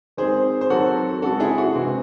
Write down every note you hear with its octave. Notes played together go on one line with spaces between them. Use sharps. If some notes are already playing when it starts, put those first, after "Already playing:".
D#3 G#3 C4 G#4 C5
C5
D#3 F#3 C4 F#4 A4
C#3 G#3 C4 F#4 A4
E4 G#4
F#4
C3 E3 G#3 C4